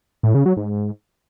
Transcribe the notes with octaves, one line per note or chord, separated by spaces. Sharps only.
A2
C#3
F#3
G#2